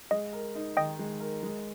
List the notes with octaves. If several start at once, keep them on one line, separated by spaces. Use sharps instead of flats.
G#3 D#5
A#4
D#4
D#3 D#5 G5
G#3
A#4
G#3